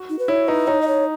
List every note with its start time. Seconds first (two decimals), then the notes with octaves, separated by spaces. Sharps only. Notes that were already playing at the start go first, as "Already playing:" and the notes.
Already playing: F#4
0.09 D#4
0.19 B4
0.28 E4 C#5
0.48 D#4 B4
0.67 D#4 C#5
0.82 D#5
0.87 C#5